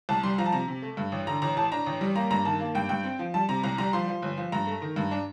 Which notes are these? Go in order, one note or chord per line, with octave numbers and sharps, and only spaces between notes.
C2 A5
G3 C6
F3 A#5
A5
C3 A#5
C3
A3
G2
A1
D3 A#5
A1 A#5
A2 A5
D4 A#5
A1
G3
A#3 A#5
G2 A#5
D#3 A5
A#3
G2 G5
G2 G5
C4
F3
G3 A5
C3 A#5
C2 A#5
G3 A#5
F3 C6
F3
G1
F3
G2 A#5
A3
D#3
G2
D4